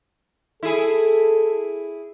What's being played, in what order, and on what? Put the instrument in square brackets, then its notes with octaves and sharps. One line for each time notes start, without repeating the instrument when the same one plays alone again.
[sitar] E4 G#4 [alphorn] A4